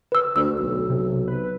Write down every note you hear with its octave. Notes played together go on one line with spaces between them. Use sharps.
B4 E6
D2 E6
B1
C3
B4